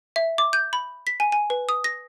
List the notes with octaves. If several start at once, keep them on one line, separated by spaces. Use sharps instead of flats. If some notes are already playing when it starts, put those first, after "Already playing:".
E5
D6
G6
B5
B6
G#5
G#5
B4
D#6
A#6